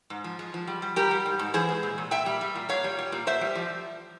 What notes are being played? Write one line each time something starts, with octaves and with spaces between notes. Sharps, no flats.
G#2
F3
G#3
F3
G3
G3
G3 G4 A#4
G3
G#2
G#2
E3 G#4 C5
G#3
A#2
A#2
A#2 E5 G5
G3
G3
A#2
A#2 C#5 F5
G3
G3
A#2
A#2 C5 E5
G3
F3